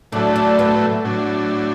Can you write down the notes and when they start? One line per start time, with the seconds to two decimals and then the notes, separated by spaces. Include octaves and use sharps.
0.12 A2 F#3 A3 D4
0.36 D4
0.59 B3
1.05 A2 F#3 D4